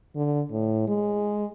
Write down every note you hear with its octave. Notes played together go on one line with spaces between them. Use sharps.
D3
A2
G#3